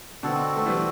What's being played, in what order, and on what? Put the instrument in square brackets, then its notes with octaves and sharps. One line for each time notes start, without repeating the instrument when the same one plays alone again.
[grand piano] B2 D3 [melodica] C4 F#4 A4
[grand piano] A3
E3 G3